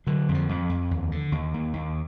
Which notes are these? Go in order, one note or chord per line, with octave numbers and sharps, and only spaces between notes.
D3 F#3
F2
F3
F2
F2
D#2
D3
D#2
D#2
D#2